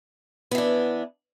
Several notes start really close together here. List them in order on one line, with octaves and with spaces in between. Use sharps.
B3 E3 D4